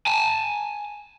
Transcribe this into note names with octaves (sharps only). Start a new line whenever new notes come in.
G#5 A5